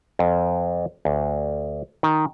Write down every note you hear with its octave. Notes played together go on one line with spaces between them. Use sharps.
F2
D2
D#3